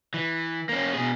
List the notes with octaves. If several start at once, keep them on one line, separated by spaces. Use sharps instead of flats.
E3
A#3 C#4
B2 G#4